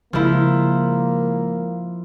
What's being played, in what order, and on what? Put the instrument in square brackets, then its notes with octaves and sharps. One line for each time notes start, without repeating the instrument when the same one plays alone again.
[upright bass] C#3 G#3 [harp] F3 E4 [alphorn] A#3